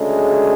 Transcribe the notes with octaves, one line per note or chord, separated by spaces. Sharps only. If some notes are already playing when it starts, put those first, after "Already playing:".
Already playing: D2 C#3 G#3